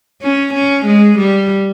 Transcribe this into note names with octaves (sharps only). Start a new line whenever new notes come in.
C#4
C#4
G#3
G3